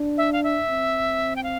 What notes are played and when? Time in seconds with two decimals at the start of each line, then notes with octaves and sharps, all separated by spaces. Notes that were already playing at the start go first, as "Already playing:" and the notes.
Already playing: D4
0.18 E5
0.33 F5
0.44 E5
0.69 C4
1.36 G5
1.43 F5